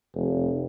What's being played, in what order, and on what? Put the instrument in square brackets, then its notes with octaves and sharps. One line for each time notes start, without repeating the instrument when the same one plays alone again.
[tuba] F1